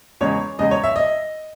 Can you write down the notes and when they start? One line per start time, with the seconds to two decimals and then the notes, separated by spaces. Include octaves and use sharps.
0.21 E2 C#3 G#3 C#5
0.59 E2 C#3 G#3 D#5
0.71 C#5
0.83 E5
0.96 D#5